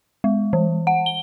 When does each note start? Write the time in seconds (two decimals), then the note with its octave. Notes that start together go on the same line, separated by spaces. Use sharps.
0.24 G#3
0.53 E3
0.87 F#5
1.06 G7